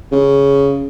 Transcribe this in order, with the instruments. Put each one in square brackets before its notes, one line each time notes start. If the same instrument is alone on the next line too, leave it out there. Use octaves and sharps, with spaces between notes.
[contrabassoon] C#3